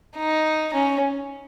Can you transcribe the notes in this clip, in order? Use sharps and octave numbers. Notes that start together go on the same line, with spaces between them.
D#4
C#4